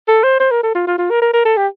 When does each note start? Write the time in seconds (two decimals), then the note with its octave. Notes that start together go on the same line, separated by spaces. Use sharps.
0.08 A4
0.24 C5
0.40 C5
0.51 A#4
0.63 A4
0.75 F4
0.87 F4
0.98 F4
1.11 A#4
1.22 A#4
1.34 A#4
1.45 A4
1.57 G4